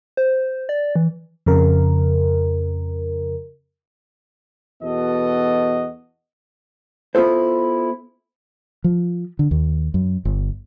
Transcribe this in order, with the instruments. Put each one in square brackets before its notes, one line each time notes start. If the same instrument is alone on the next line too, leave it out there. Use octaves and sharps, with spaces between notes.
[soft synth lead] C5
D5
E3
[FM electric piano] F2 C#3 A#4
[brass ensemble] E2 B2 B3 F#4 A4 D#5
[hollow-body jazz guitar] B3 E4 F4 A4 C5
[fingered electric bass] F3
D3
D#2
F#2
G1